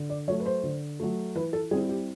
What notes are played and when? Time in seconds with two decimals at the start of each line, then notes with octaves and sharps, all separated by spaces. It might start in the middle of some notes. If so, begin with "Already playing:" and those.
Already playing: D3
0.10 D5
0.27 F#3 A3 C#5
0.40 B4
0.46 C5
0.64 D3
1.00 F#3 A3
1.35 E3 B4
1.53 A4
1.71 G3 C4 E4 G#4
1.89 G4